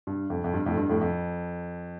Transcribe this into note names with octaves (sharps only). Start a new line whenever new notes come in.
G2
F2
F2
G2
F2 A2
G2
F2 A2
F2